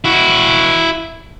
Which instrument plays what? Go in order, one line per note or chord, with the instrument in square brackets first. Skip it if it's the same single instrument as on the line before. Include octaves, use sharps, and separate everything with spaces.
[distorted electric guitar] E4 F#4